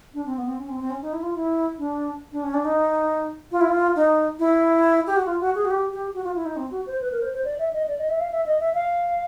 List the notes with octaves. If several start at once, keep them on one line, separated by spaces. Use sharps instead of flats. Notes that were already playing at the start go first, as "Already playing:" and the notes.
D4
C4
B3
C4
C#4
C4
C4
C#4
D#4
E4
F4
E4
D4
D4
C#4
D4
D#4
F4
E4
F4
D#4
E4
G4
F#4
F4
F#4
G#4
F#4
G4
G4
F#4
F4
E4
D#4
C4
F#4
C5
B4
A#4
C5
C5
D5
E5
D#5
D5
D#5
E5
F5
E5
D#5
E5
F5